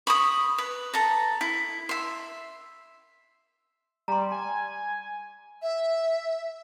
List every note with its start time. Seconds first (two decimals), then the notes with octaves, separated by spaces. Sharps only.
0.07 B5 C#6 D#6
0.58 B4
0.94 A4 A#5
1.41 E4
1.89 E5 C6
4.08 G3 A#5 C6
4.32 G#5
5.62 E5